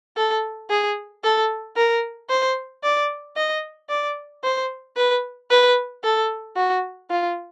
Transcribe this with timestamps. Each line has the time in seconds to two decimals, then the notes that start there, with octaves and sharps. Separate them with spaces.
0.17 A4
0.70 G#4
1.24 A4
1.77 A#4
2.30 C5
2.83 D5
3.36 D#5
3.90 D5
4.44 C5
4.97 B4
5.51 B4
6.04 A4
6.57 F#4
7.10 F4